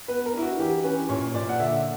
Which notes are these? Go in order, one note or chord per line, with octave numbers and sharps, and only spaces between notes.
B3 B4
A#4
D4 E4
F#4
E3 G4
C#4 B4
A#2 C#5
A#2 D5
F#5
D3 E5